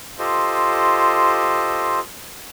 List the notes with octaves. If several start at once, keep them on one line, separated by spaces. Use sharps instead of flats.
F4 G4 A4 C5 D#5